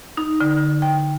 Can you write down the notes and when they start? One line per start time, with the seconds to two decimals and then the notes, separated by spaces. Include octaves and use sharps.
0.17 D#4
0.40 D3
0.82 G5